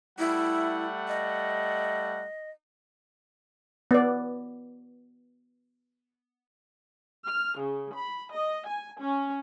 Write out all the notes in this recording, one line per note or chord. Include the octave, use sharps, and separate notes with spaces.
G3 A3 E4 F#5
D#5
B3 D5
F6
C#3
B5
D#5
G#5
C#4